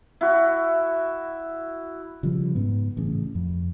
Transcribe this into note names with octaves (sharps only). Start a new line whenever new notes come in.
E4 F#4
C#3 F3 G3
G#2 B3
A1 C#3
F2